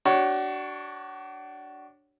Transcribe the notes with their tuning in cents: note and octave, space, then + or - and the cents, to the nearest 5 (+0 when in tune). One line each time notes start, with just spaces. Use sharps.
D4 +0 F#4 +35 C#5 +0